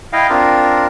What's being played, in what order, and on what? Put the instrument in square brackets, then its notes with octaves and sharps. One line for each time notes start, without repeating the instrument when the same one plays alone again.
[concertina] E4 D#5 F5 G5
C4 D4 F4 A#4